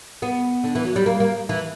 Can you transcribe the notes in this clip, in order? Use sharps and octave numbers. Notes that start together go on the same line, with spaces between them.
B3
D3
E3
F#3
G3
A#3
A#3
E3